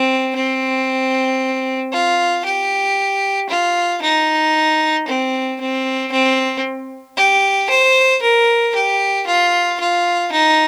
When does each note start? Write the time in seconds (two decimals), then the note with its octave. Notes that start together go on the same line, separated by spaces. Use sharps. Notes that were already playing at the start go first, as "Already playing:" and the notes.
Already playing: C4
0.35 C4
1.92 F4
2.45 G4
3.50 F4
4.02 D#4
5.08 C4
5.61 C4
6.12 C4
7.17 G4
7.70 C5
8.22 A#4
8.75 G4
9.27 F4
9.80 F4
10.32 D#4